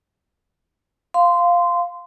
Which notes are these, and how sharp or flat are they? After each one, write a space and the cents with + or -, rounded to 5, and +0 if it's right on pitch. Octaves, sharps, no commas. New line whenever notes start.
F5 +0 C6 -15